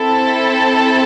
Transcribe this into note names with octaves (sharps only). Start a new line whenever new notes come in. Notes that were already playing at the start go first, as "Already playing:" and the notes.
Already playing: C4 E4 A4